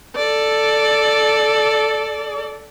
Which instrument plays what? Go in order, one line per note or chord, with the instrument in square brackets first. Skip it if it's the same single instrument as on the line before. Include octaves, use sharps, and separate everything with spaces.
[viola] A4 D5